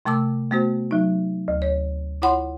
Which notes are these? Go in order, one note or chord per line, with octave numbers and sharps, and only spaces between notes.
C3 A3 A5 D6 E6
A3 B3 F#4 C5
F#3 D#4
D2
C#5
E4 F4 C#5 F#5 B5 C6